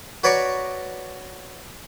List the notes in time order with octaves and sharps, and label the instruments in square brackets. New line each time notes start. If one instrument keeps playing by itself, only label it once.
[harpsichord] F#4 B4 C#5 D5 A#5 C#6